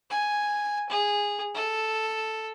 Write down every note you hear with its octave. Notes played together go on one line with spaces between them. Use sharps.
G#5
G#4
A4